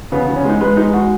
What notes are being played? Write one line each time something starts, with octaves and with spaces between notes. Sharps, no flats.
C#3 B3
C#3 B3
C#4
G#3
D#4
G#3 B4
G#3 D#4
G#3 F#4